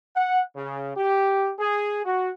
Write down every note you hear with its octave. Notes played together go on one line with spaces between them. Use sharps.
F#5
C#3
G4
G#4
F#4